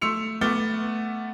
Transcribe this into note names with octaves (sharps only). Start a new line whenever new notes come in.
A3 C6 E6 C#7 F7
A3 B3 D6 F6 A6 G7